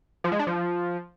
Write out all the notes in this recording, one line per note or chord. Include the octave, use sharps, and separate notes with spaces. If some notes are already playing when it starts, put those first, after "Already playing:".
F3
G#3
D4
F3